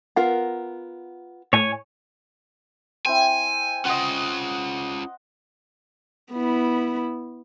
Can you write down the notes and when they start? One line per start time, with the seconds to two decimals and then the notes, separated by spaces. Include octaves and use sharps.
0.16 B3 F4 A#4 F#5
1.53 A2 C#5 G#5
3.06 C4 E4 G#5
3.85 C#4 F4 D#5 F#5
6.32 B3 E4